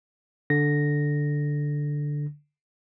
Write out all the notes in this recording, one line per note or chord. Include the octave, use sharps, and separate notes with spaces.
D3 A#6